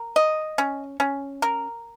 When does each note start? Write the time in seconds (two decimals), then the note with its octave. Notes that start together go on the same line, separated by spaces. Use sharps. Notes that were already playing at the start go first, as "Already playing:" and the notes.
Already playing: A#4
0.16 D#5
0.58 C#4
1.00 C#4
1.42 A#4